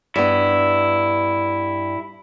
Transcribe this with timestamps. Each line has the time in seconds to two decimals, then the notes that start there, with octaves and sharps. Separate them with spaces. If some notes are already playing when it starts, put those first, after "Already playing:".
0.16 G2 B3 E4